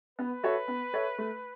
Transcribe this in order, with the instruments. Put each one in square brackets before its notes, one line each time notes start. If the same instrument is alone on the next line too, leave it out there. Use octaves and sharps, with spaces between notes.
[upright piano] B3 [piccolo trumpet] B4
[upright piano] F#4 A4 C#5 E5
B3
A4 C#5 E5
A3